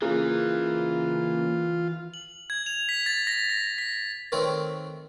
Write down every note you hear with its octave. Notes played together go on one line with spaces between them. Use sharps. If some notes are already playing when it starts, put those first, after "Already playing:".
C#3 E3 A#3 F4 G#4
F#7
G#6
F7
B6
A6
A#6
B6
B6
D#3 A3 C4 A#4 B4 C#5